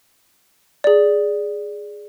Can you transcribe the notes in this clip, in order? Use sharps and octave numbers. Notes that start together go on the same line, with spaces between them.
G#4 D5